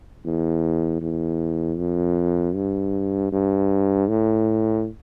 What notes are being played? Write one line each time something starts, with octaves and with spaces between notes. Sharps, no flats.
E2
E2
F2
G2
G2
A2